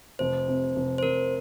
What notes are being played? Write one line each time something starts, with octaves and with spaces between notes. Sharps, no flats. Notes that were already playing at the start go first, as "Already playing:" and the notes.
F1 C5
C3
F1
C5
F1 A#4